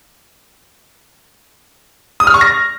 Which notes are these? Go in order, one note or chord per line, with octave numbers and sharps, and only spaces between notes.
D#6
F6
C#6
A#6